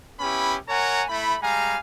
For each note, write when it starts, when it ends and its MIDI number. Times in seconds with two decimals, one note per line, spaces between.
0.20 0.56 59
0.20 0.56 61
0.20 0.56 64
0.20 0.56 67
0.20 0.56 83
0.69 1.04 70
0.69 1.04 73
0.69 1.04 78
0.69 1.04 80
0.69 1.04 82
1.09 1.36 57
1.09 1.36 64
1.09 1.36 83
1.43 1.77 55
1.43 1.77 56
1.43 1.77 77
1.43 1.77 80
1.43 1.77 82